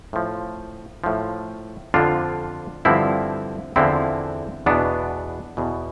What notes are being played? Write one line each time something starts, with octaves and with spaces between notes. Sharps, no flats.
A2 F3
A2 F3
F2 D3 F3 D4 F4
G2 D3 F3 C4 E4
E2 D3 F3 C4 E4
E2 B2 B3 D4
E2 B2